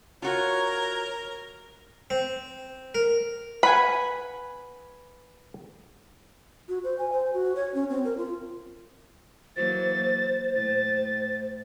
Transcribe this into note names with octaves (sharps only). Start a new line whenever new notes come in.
F4 F#4 A#4 C#5
C4
A#4
B4 F#5 G#5 B5
F#4
C5
G#5
C5
F#4
C#5
C#4
C4
A#4
F4
E3 F#3 A#3 C5 A6
A2 A6